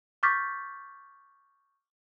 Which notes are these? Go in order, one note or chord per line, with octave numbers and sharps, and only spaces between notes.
C#6 D6 F6 G6 A6 B6